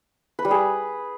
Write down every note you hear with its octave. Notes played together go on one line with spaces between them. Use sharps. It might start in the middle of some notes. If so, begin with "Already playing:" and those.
B4
G3
G#4